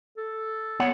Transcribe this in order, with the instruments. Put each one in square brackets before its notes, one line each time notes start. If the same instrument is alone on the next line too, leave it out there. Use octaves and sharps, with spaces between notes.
[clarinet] A4
[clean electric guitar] B3 C#5 F#5